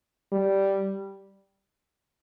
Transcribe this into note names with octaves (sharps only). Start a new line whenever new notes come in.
G3